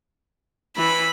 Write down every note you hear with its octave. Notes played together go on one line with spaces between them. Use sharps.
E3 B5